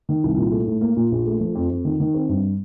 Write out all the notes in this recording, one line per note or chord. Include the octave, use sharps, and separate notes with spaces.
D#3
C2
A#2
A3
A2
A#3
A#2
A#1
A3
F3
F2
F2
D#3
D#3
C4
G2